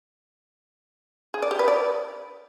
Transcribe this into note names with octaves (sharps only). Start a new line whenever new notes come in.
G#4
D5
G4
B4
D5